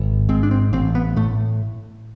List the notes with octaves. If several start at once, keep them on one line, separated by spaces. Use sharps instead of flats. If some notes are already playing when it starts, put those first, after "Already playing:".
Already playing: G#1
G#2 C4
D4
C4
A1 C4
B3
A2 A3